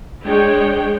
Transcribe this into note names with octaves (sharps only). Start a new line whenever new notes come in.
G#3 D4 C#5 G5